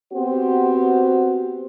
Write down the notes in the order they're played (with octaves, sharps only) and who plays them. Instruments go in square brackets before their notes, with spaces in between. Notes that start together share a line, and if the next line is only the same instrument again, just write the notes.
[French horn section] B3 C4 F#4 G4 C5